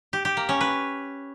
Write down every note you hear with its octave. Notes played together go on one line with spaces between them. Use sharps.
G4
G4
A#3
C#4
B4